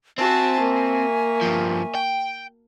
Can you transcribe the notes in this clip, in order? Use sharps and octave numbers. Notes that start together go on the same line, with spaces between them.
C4 F#4 E5 G#5 A5 C#6
A#3
G2 F3
G5